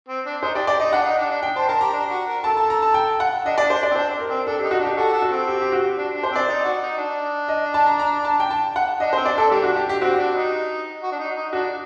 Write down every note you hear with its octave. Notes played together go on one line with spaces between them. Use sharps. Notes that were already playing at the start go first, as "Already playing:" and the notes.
C4
D4
D#4 C5
G4 D5
G4 D5
D#4 D#5
D4 F#5
D#4
D4
D4
G5
C5 A5
A#4 A5
G4 A#5
D4
F#4
A#4
A4 A5
A5
A#5
A5
G5
F#5
D4 D#5
D5
D4
C5
D5
C4
D4 C5
A#4
C4
D4 A4
G4
D#4
F#4
D4
G4
F#4 A4
A4
F#4
C4
G4
G4
F#4
D4
D4
C5
C4 D5
D#4
F#4
D#4
D4
D#5
A5
A#5
A#5
A5
G5
A5
F#5
D4 D#5
C5
C4
D5
D4 A4
G3 A#3 D4 G4
F#4
G4
G4
C4 F#4
D4
D#4
F#4
D4
D#4
D#4
D4 F#4